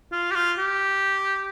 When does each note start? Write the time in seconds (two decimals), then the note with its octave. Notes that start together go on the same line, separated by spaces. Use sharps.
0.12 F4
0.31 G4
0.35 F4
0.58 G4